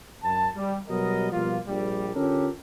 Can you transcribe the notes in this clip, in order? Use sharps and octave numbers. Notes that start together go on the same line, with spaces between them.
F#2 A5
G3
B2 F#3 G3 B3 A#4 D#5
B2 F3 G3 A#3 F4
A#1 G3
D3 C#4 F4 G4 A4 A#4